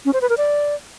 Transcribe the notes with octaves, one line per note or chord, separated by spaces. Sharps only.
C#4
C5
B4
A#4
D5